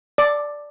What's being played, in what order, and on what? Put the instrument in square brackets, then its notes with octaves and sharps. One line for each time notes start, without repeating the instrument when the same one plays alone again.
[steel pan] D5